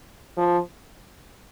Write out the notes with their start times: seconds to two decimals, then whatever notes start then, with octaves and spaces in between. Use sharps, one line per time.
0.38 F3